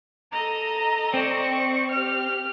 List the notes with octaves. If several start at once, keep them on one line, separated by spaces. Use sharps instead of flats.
A4 D#5 A#5
C4 D5 C#6
G4 F6